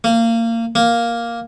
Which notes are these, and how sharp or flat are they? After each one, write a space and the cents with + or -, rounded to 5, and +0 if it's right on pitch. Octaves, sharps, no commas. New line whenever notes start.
A#3 -25
A#3 +5